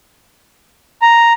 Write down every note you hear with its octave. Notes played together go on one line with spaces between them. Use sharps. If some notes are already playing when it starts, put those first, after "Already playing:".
A#5